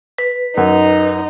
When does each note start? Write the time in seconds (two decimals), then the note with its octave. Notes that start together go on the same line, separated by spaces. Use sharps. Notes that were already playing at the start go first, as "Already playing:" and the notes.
0.18 B4
0.57 F#2 D#4